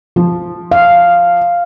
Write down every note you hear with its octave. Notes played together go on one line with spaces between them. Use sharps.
F3
F5